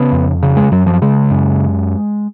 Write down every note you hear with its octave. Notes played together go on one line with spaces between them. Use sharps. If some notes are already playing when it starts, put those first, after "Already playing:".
Already playing: C#3 B3
F2
C#3
G#3
F#2 F#3
F3
C#3 G#3
F#2